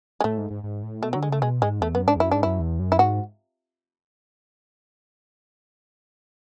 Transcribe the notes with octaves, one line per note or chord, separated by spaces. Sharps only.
G#3
A2 A3
G#2
G#2
G#2
A2
B2 A3
F#3
D3
G#3
C#3 A3
B2 G#3
G#2 G#3
E2 A3
F#2 B3
G#2 D4
E2
F#2 E4
G#2 D4
F#2 E4
E2
F#2
E4
G#2 F#4